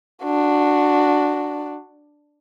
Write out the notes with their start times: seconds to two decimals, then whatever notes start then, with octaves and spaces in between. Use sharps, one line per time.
0.24 D4 F#4